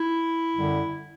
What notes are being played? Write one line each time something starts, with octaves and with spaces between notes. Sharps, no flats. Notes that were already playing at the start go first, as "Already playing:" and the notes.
Already playing: E4
F#2 D3 G3